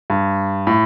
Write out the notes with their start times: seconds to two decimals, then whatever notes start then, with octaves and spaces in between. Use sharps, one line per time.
0.10 G2
0.67 A2